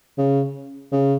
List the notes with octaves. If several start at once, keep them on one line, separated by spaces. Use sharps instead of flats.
C#3
C#3